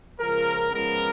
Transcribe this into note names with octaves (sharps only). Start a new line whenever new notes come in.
C#2 C#3 F3 A#4
C#2 C#3 F3 G#3 B3 A#4